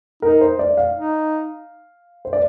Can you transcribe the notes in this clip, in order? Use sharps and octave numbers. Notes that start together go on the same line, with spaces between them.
D#4 A#4
C5
D5
F5
D#4
C5
D5